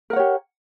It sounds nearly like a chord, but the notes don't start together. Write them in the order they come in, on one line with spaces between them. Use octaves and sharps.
A#4 F#5 C#5 G4